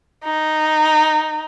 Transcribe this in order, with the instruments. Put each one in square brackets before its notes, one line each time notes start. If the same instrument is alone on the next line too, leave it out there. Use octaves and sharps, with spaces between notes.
[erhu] D#4